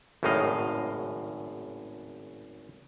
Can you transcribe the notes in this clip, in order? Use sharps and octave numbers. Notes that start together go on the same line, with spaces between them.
G#1 F#2 A2 C#3 D#5 F5